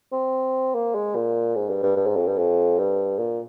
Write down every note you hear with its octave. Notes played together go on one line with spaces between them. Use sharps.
C4
A#3
G#3
A#2
G#2
G2
G2
G2
G#2
F2
G2
F2
G2
A#2